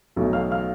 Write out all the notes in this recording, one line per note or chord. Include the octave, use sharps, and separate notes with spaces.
B1 B2 A3
F5 F6
F5 F6